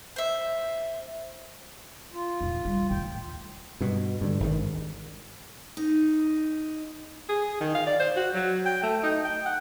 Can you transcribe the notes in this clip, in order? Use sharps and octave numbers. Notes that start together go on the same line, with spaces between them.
C5 E5
F4
E2 A#2
G3
D#2 A2 G5
G2 B2
G2 D3
G#1 G#2 D#3
D#4
G#4
D#3
F5
D5
C5
F#4
F#3
G5
A3
D#4
G5
F#5